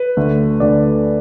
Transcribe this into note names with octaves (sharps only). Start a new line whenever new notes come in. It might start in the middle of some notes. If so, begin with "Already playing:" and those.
Already playing: B4
D2 D3 A3
D2 D3 A3 D5